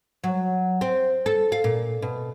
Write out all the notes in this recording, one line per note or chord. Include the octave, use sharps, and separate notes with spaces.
F#3
C4
A4
F5
A#2
B2